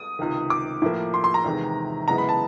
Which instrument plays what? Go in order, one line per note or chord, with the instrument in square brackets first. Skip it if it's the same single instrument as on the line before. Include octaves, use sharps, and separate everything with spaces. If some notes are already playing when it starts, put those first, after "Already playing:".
Already playing: [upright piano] D#6
C#2 C3 D#3
D6
A2 F3 A#3
C6
C6
A#5
E2 C3 D#3 G#3
F#2 C#3 E3 G#3 B3 A#5
B5
A5